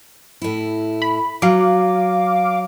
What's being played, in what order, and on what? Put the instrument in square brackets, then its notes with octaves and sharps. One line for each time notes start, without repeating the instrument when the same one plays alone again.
[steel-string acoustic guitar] A2 E4
[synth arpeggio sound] B5
[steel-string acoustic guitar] F#3 [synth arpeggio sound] F5 D6